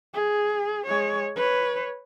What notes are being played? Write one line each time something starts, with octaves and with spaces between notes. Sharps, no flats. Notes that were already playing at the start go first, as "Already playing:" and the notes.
G#4
G#3 C#5
B4 C#5